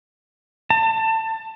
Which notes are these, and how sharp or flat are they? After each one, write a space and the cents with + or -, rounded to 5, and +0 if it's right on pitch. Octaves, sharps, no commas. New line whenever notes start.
A5 +25